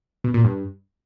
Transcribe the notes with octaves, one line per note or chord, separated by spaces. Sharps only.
B2
A#2
G2